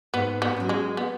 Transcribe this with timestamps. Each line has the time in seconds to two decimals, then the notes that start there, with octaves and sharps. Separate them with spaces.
0.14 G#2 B3
0.42 B3
0.56 F#3 C#4
0.69 G#3
0.97 B3